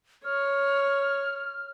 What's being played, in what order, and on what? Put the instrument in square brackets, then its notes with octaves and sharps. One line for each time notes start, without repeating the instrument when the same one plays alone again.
[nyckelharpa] C#5 [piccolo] F6